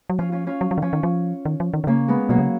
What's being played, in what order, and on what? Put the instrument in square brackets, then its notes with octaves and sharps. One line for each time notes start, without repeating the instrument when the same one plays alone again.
[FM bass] F#3
[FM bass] F3 [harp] C#4 F4
[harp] C#4 F4
C#4 F4
[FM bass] F#3
F#3
D#3
[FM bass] F3 [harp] C#4 F4
[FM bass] D#3
F3
D#3
F3
D#3
D#3
[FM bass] C#3 [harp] A#3 C#4
[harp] G#3 B3
[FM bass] B2 [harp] F#3 A#3
[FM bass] C#3